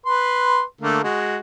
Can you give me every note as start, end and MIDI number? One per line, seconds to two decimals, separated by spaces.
0.06 0.62 71
0.06 0.62 84
0.81 1.01 50
0.81 1.01 57
0.81 1.01 58
1.04 1.37 56
1.04 1.37 66